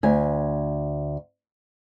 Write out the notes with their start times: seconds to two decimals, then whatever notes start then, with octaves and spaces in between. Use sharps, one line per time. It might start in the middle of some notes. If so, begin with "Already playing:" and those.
0.03 D2 G#5